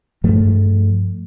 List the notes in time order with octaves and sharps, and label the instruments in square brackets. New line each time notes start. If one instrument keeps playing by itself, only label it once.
[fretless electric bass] G2 F3 A3